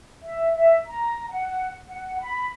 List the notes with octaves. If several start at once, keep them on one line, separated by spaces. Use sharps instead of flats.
E5
E5
A#5
F#5
F#5
B5